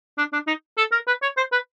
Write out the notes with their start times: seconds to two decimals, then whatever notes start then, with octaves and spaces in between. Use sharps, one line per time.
0.18 D4
0.33 D4
0.47 D#4
0.78 A4
0.92 A#4
1.07 B4
1.22 C#5
1.37 C5
1.52 B4